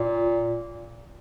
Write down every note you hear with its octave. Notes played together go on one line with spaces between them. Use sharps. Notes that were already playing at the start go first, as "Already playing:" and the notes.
Already playing: A#2